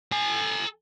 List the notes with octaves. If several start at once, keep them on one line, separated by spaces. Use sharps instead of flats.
A4 G#5